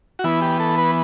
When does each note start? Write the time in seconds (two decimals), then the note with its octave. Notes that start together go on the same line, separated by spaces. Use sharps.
0.19 F#4
0.24 E3 B3 E4
0.42 G4
0.60 A4
0.78 B4